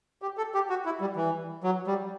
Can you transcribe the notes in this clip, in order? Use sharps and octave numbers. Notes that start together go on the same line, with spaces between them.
G4
A4
G4
F#4
E4
G3
E3
F#3
G3